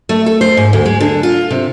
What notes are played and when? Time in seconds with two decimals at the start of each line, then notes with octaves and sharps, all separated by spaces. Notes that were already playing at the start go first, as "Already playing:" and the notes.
0.09 A3
0.26 A4
0.41 C5
0.57 G#2
0.73 D2
0.86 G#3
1.01 D3
1.23 F4
1.50 C3